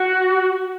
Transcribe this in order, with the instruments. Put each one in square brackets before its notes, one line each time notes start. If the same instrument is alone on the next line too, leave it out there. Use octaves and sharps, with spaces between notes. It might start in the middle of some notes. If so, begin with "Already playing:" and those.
Already playing: [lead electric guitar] F#4